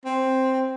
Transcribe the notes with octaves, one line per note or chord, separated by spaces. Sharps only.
C4